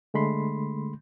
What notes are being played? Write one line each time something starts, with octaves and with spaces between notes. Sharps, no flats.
D3 G#3 A3 B5 C6